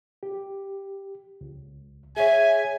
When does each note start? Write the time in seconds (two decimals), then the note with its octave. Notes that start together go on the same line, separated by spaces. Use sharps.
0.23 G4
1.41 C#2
2.17 G#4 C#5 E5 G#5